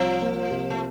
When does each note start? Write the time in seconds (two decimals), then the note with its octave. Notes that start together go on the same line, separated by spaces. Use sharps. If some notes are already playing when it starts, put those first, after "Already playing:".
Already playing: C2 F3
0.21 A#3
0.51 C3
0.70 A3